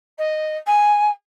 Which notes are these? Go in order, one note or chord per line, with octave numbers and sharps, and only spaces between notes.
D#5
G#5